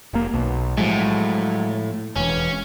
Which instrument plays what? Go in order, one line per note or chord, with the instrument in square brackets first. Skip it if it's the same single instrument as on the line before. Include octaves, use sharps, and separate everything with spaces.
[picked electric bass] F1 A#3
B1
[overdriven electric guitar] A2 [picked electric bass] F3 F#3 G#3
[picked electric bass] E1 E3 [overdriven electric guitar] C#4